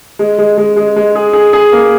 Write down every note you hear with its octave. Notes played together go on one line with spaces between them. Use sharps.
G#3
G#3
G#3
G#3
G#3
G#4
G#4
G#4
A#3